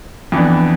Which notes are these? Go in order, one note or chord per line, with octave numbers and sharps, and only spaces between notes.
F2 E3 B3 D4